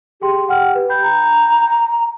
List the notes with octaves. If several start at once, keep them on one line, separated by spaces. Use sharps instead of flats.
G4 G#4 G5 C6
F#5 G5 F6
B4
G5 B5 G6
A#5